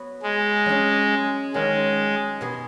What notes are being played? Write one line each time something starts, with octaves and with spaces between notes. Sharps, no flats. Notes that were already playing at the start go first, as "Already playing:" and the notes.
Already playing: F#3 B3 F#4
G#3
F#3 C#4 G#4
D#3 F#3 G#3 C#4
B2 B3 G#4